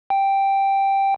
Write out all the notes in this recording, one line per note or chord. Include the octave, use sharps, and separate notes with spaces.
G5